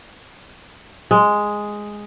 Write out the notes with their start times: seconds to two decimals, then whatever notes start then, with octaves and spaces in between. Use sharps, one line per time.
1.11 G#3